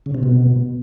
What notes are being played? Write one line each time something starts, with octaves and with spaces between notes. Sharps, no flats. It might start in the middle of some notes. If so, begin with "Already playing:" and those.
C#3
C3
B2